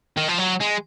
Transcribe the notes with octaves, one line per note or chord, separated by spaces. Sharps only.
D#3
F3
F#3
G#3